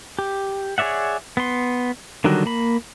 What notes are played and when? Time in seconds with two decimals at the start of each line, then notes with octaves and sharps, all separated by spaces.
0.19 G4
0.78 G#4 C#5 D5 E5 F#5
1.37 B3 C6
2.24 D3 D#3 F#3 G3 F#4
2.46 A#3 B5